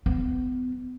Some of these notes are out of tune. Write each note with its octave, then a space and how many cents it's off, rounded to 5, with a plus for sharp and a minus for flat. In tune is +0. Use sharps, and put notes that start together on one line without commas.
B3 +35